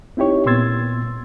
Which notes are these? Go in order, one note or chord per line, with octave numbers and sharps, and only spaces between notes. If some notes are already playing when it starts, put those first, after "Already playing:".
C4 D#4 E4 G4 C#5
A#2 B3 C6 E6 G#6 A6